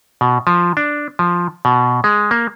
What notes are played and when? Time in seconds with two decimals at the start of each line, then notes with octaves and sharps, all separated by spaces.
0.21 B2
0.47 F3
0.77 D4
1.19 F3
1.65 B2
2.04 G#3
2.31 A#3